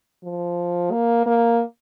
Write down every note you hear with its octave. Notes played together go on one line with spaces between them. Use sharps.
F3
A#3
A#3